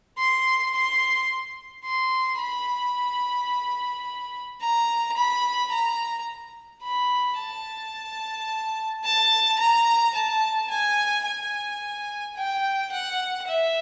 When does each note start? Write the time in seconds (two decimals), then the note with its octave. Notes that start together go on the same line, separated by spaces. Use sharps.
0.18 C6
0.74 C6
1.84 C6
2.40 B5
4.61 A#5
5.16 B5
5.71 A#5
6.83 B5
7.38 A5
9.04 A5
9.59 A#5
10.15 A5
10.70 G#5
11.25 G#5
12.36 G5
12.91 F#5
13.47 E5